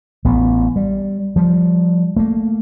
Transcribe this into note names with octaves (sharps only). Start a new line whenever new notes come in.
A1 B3
G3
F3 G3
A3 A#3